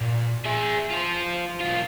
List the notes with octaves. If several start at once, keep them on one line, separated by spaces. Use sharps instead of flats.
A#2
G#4 E5
F4 C5
B1 F4